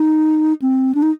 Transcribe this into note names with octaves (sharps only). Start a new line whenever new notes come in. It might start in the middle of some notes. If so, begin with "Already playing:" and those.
Already playing: D#4
C4
D4
D#4